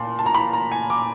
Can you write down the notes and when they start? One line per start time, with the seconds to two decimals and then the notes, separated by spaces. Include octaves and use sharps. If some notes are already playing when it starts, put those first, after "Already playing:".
Already playing: A#2 A5 C6
0.19 A5
0.26 A#5
0.34 B5
0.53 A#5
0.71 G#5
0.90 D6